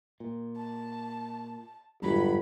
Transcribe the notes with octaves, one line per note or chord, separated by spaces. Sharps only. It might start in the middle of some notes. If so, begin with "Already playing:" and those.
A#2
A5
G1 F2 G#2 F#3 B5